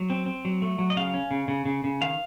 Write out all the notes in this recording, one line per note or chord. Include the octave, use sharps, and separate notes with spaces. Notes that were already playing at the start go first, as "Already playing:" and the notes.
Already playing: F#3
C4
C4
F#3
A3
F#3
D#5
C#3 F5
C#4
C#3
C#3
C#3
C#3
D#3 F5